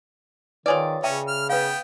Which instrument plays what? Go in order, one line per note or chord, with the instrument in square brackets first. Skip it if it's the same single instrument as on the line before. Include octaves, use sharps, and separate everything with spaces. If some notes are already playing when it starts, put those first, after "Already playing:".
[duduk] D#3 [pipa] F4 G#4 D5 [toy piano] B4 C#5
[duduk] C#3 [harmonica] C#4 [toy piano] E5 G5 A5
[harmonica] F6
[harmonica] B3 G5 [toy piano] B4 F5